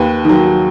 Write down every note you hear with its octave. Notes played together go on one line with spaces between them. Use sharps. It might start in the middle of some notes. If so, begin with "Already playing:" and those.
Already playing: D#2 B4
D#3 F#3